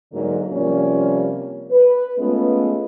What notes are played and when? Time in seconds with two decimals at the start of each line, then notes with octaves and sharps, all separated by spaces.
0.12 G#2 D3 F#3 A#3 D4
0.52 C3 F3 G3 A#3 C#4
1.71 B4
2.19 G#3 A3 B3 C#4 F4